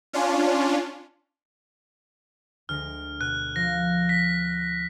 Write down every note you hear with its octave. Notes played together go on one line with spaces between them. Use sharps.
C#4 D4 F4
D2 G#3 F6 A#6
B2 F#6
F3 A#6
B6